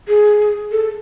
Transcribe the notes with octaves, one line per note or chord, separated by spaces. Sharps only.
G#4
A4